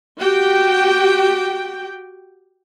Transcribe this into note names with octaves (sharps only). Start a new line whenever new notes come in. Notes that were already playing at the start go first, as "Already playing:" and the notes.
F#4 G4 G5